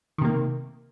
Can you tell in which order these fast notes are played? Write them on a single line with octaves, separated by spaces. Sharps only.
D#3 C3 A#3